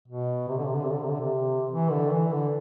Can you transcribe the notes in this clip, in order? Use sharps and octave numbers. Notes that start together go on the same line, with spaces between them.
B2
C3
D3
C3
D3
C3
D3
C3
D3
C3
E3
D3
E3
D3